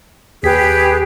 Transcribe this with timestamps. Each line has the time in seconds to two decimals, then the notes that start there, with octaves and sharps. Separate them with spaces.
0.43 D#2 G4 G#4 B4 B6